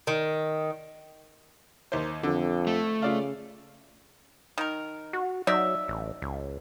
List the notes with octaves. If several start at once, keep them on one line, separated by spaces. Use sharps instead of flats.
D#3
D#2 C5
F2 D3
A3
C#3 F4 D5 F5
D#3 A#4
F#4
F#3 D#4 D5 E5
A1
C#2